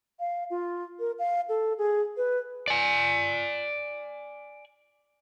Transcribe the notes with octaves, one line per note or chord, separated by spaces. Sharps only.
F5
F4
A#4
F5
A4
G#4
B4
D5 G#5